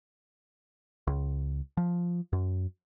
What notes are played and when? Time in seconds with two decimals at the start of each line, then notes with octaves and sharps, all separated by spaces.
1.07 C#2
1.77 F3
2.33 F#2